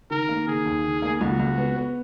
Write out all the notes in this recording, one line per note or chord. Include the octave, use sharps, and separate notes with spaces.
D#3 A#4
A#3
D#3 G#4
D#2
D#3
A#3
C#2 F#4
C#2
B3
B3